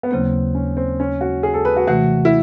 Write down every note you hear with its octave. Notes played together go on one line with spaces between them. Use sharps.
B3
D#2 C#3 F#3 A#3 C4
C#4
C4
C#4
F#4
G#4
A4
B4
F#4
C3 E3 A3 F#4
E4